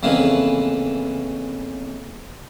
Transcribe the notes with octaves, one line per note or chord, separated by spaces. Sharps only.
F2 C#3 E3 A#3 B3